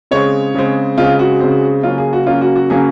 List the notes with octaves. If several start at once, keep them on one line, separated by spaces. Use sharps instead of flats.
C#3 G#3 C4 C#5
C#3 G#3 C4
C#3 G#3 C4 F4
F#4
C#3 G#3 C4
C#3 F#3 A#3 C#4 F4
G#4
F#4
C#3 F#3 A#3 C#4 F4
F#4
F#4
C#3 F#3 A#3 C#4 G#4